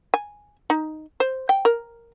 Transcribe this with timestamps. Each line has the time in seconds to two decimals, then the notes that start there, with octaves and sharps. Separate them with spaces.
0.14 G#5
0.70 D#4
1.20 C5
1.49 G5
1.65 A#4